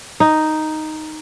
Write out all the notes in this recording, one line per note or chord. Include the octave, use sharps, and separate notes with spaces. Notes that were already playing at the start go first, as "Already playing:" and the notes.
D#4